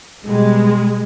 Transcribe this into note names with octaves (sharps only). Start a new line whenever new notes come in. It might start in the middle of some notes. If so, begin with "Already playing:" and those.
B2 G3 G#3